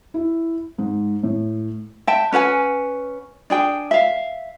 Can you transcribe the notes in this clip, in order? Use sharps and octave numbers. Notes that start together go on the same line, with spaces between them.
E4
G#2
A2
E5 G5 A5
C#4 B4 F#5 G#5
D4 G#4 G5
E5 F5